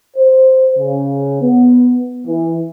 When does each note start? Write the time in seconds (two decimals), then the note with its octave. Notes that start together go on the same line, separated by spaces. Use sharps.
0.17 C5
0.78 C#3
1.42 B3
2.27 E3